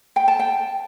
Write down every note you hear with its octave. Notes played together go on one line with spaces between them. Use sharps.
G5
A5
G5